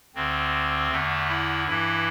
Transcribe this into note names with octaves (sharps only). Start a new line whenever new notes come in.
D2 D3 C4
E2 D3 A3
E4
G2 E3 E4